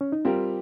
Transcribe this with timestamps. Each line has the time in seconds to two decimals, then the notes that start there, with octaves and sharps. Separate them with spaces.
0.01 C#4
0.12 D#4
0.25 G3 C4 F4 G4 A#4